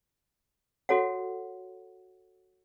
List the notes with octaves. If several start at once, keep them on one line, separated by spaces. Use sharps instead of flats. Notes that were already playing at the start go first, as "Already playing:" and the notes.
F#4 A4 C#5 F#5